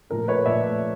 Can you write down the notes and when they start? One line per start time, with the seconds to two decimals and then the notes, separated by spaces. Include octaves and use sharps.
0.10 A#2 F3 A3 A#4
0.28 B4 C#5
0.46 A#2 F3 A3 D5 E5